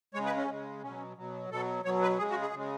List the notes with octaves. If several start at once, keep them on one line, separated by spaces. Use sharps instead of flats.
C#3 G#3 C#5
B4
C#4
C#3 G#3
B2 F#3 C#4
B2 F#3
B2 F#3 A4
B2 F#3 C#5
B4
C#3 G#3 G#4
F#4
G#4
C#3 G#3